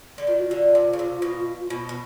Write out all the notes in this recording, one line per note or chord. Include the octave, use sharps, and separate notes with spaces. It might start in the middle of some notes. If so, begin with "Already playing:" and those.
D3
D#3 F4
F#4
D3 F4
C3
C#3
C3
B2
B2
B2